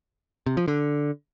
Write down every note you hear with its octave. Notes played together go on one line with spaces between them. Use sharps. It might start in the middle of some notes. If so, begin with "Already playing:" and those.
C3
F3
D3